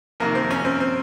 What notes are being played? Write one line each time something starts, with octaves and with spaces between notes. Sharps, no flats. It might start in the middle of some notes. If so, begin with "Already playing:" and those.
F2 C3 D#3 A#3
C4
C#4
C4
C4